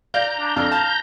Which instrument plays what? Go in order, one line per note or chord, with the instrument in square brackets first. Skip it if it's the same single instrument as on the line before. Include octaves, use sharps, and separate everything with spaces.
[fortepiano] D5 F5 [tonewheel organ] A#5 G6
[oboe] D4
[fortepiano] F2 D4 A4 [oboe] F5
[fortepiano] A5